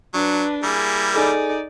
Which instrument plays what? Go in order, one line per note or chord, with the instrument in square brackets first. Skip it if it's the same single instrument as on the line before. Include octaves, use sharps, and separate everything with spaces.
[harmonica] F#3 [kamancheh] D4 B4
[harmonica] G3 A#3 E4 [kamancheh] G#4
[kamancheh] D#4 D5 [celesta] G#4 A4 G#5